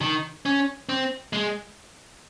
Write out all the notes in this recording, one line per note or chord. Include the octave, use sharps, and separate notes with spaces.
D#3
C#4
C4
G#3